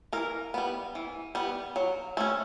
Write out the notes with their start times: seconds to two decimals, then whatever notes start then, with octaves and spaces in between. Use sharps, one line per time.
0.13 E3 A#4
0.54 G3 B3
0.95 E3
1.35 G3 B3
1.76 F#3
2.17 A3 C#4